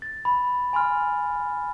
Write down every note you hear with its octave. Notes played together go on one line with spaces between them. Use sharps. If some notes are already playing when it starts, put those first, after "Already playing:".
A6
B5
G#5 B5 C6 F6